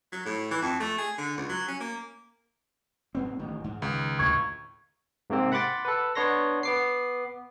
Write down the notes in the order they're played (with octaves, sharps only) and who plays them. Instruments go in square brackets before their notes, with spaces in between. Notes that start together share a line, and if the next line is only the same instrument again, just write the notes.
[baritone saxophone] F#3
A2
E3
F2
A3
G#4
D3
C#2
F#3
C#4
A#3
[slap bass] G#2 B3 C4
A1 D#3
G#2
[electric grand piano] C#2 [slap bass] D#3
[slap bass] D2 A2 D3 [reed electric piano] C#6 G#6
[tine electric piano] G#2 C3 A#3 C4
F#5 B5 C6 D6 A6
A4 B4
B3 D4 C#5 C6 A#6
B3 D6 C7